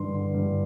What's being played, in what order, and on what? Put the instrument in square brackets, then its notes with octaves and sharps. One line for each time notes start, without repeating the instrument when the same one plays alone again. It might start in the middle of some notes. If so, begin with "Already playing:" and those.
Already playing: [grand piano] G2 D3 E3 C6
D3
G2